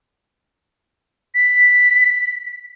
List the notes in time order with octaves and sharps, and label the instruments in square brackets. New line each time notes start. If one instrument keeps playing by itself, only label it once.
[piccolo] B6